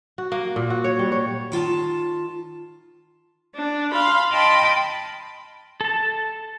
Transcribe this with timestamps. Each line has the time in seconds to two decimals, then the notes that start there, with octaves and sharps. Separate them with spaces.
0.18 F#4
0.32 A#3
0.56 A#2
0.70 F#4
0.84 C#5
0.99 G3
1.12 C#5
1.52 D#3 F4 G5 A5
3.54 D4
3.91 F5 B5 C6
4.32 D#5 G5 A5 B5 C6
5.81 A4 A5